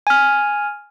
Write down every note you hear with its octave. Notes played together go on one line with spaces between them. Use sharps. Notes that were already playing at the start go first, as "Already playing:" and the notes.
G#5 F6